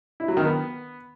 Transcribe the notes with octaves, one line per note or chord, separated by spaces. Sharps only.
E4
F#3
D#3
B3